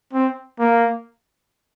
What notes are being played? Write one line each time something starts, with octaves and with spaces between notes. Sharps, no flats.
C4
A#3